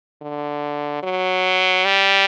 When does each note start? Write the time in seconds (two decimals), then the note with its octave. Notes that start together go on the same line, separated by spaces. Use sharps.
0.22 D3
1.03 F#3
1.85 G3